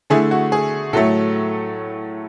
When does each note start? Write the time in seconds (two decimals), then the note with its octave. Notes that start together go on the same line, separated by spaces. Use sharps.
0.10 D3 A3 E4 G#4
0.31 F#4
0.52 G#4
0.93 A2 F#3 A3 A4